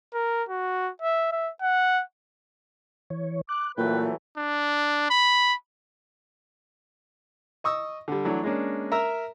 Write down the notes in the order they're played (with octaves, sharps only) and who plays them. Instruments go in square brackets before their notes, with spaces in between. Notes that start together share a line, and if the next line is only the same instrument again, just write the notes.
[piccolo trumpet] A#4
F#4
E5
E5
F#5
[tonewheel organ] E3 C#5
[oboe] D6 [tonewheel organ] F#6
[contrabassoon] A#2 [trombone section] E3 F#3 A3 [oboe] B4 [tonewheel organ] G5
[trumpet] D4
B5
[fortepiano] D#5 C#6 D#6 E6
D3 G3
E3 F#3 A3 D4
G#3 A#3 C#4 D4
A#4 E5 A#5 E6